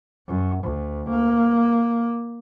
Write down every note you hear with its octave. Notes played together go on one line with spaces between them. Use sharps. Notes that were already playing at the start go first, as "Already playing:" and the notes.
F#2
D2
A#3